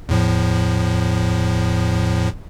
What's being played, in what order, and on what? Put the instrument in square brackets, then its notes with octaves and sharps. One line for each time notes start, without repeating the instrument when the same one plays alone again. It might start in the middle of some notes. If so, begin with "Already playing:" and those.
[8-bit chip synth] E2 A2 F3